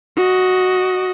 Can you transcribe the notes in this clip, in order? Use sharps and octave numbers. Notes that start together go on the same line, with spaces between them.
F#4 D#5